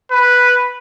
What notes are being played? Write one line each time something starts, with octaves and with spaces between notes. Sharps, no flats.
B4